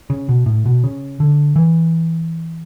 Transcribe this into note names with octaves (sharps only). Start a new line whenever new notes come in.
C#3
B2
A2
B2
C#3
D3
E3